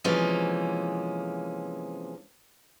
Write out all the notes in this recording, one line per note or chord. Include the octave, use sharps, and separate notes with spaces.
C3 E3 F3 G#3 A#3 C#4